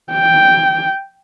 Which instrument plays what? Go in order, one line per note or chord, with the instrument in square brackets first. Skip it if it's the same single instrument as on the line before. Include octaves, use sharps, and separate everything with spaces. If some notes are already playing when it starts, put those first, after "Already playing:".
[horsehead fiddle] G5